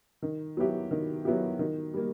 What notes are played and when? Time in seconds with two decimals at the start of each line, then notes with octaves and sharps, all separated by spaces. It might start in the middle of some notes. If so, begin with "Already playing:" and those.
0.22 D#3
0.57 F#3 B3 E4 G4
0.91 D#3
1.25 F#3 B3 E4 G4
1.59 D#3
1.94 G3 A#3